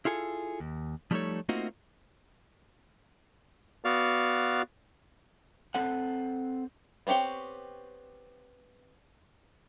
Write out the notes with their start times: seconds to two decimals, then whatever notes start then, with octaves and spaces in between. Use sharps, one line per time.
0.05 E4 F4 G#4 A4 G#5
0.60 D#2
1.11 F3 G3 A3 D#4 A4 C#5
1.49 A3 A#3 C4 D#4 F4 F#4
3.85 B3 F#4 D5 F5
5.75 C4 A4 F#5
7.07 B3 C4 G4 C#5 G5